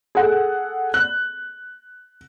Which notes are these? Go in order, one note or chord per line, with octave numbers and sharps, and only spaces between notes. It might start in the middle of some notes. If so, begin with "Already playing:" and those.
G#4 A4 F#5
F#6